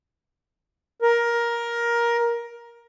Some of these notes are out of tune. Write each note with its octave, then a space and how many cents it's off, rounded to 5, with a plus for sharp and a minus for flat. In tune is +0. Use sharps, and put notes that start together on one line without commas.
A#4 +15